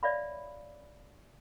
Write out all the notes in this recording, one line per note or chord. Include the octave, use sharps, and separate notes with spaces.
C#5 D5 E5 F5 B5